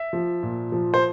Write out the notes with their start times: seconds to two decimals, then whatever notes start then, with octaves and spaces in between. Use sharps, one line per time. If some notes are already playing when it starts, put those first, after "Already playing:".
Already playing: E5
0.13 F3
0.43 A#2
0.72 F3
0.94 C5